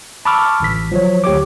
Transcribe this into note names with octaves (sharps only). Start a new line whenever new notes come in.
A5 B5 C#6 D6 E6 F6
A1 B6
F3 F#3 C#5
D2 G4 C#5 D6